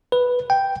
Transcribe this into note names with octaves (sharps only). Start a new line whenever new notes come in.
B4
G5